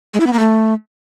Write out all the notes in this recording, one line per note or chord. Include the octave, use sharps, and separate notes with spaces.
G#3
E4
B3
A#3
A3